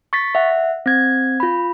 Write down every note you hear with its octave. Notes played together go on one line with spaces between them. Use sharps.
C#6 A6 B6
E5 F#5
C4 G#6
F4 B5